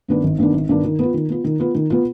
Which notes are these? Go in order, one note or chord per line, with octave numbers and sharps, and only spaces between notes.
G2 D#3 B3 D4
G#1
G2 D#3 B3 D4
G#1
G2 D#3 B3 D4
D#3
B3 F4
D#3
B3 F4
D#3
B3 F4
D#3
B3 F4